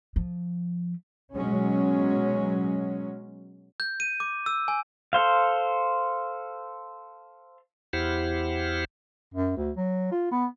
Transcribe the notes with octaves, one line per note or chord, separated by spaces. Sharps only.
F3
B2 F#3 G#3 C#4
G6
D#7
D6
E6
G#5
A4 C5 F5
E2 E4 G4 C5 F#5 F6
F#2
D2
F#3
F4
B3